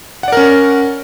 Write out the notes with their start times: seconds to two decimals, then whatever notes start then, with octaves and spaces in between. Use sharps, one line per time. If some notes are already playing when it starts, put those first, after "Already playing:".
0.23 F#5
0.28 D5
0.32 A#4
0.37 C#4